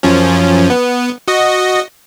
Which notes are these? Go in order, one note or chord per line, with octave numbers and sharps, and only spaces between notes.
F#2 F3 C#4
B3
F#4 D#5